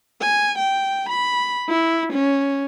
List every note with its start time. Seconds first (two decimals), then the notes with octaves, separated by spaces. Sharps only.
0.21 G#5
0.58 G5
1.09 B5
1.69 E4
2.13 C#4